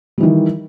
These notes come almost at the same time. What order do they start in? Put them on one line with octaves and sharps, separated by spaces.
G3 E3 D#3